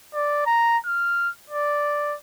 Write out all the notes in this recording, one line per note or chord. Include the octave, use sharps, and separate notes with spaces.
D5
A#5
F6
D5